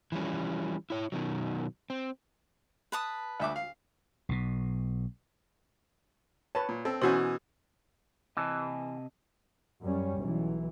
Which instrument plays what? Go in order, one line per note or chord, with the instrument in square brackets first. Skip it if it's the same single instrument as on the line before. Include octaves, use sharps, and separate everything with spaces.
[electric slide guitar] E3 F3 G3 C#4
E4 C#5
B2 D#3 F#3
C4
[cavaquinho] B4 A5 D#6
[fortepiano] D2 E5 D6
F5
[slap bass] B1 B2
[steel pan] B4 C#5 [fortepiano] A5
[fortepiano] A#2
[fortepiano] C4 [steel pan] A4
[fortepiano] B2 E3 G#5 [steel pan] C#4 F#4 C5
[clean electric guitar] C3 D#5 A5 [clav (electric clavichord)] E3
[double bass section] F#2 G3 C#4
B1 E3